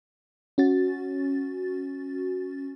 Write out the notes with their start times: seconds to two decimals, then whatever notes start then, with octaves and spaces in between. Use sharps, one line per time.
0.58 C#4 F#4 A6